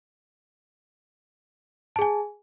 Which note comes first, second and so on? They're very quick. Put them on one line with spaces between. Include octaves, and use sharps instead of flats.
A5 G#4 G#5